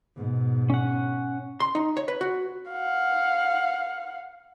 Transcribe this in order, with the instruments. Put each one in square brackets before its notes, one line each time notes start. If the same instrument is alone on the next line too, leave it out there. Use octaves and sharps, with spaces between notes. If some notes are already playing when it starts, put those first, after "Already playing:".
[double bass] G#2 B2
[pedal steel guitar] C#4 F#5
[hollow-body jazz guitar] C6
D#4
C#5
B4
F#4
[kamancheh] F5 F#5